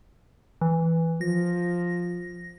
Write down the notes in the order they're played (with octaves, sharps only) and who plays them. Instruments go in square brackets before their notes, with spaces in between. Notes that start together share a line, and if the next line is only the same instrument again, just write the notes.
[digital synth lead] E3
[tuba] F3 [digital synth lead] A#6